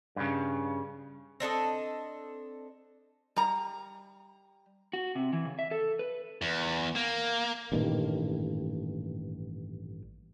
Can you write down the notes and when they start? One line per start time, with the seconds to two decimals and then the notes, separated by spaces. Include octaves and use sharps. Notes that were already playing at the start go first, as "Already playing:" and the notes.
0.16 G2 C#3
1.40 C4 D4 A4 D#5
3.36 G3 A#5
4.93 F#4
5.15 C3
5.33 E3
5.45 C#3
5.59 E5
5.71 A4
5.99 B4
6.41 E2
6.96 A#3
7.72 A1 G2 A#2 D#3